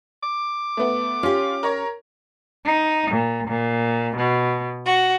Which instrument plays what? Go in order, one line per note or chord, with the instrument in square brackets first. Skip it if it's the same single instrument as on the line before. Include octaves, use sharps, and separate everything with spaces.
[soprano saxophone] D6
[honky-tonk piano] A3 B3
[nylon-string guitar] C#4 G4 [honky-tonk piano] F4
[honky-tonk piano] A#4 C#5
[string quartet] D#4
A#2
A#2
B2
F#4